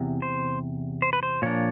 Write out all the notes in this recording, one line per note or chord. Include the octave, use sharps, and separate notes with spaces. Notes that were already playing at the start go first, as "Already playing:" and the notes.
Already playing: E2 C3
C5
C5
B4
C5
A#2 F3 A#3 D4 C#5